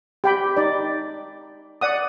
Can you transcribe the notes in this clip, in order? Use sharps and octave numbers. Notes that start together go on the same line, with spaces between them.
G4 G5 B5
D#4 D5
D5 F#5 D#6